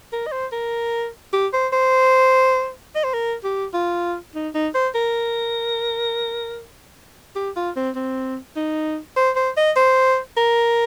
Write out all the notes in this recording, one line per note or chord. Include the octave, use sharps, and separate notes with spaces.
A#4
D#5
C5
A#4
G4
C5
C5
D#5
C5
A#4
G4
F4
D#4
D#4
C5
A#4
G4
F4
C4
C4
D#4
C5
C5
D#5
C5
A#4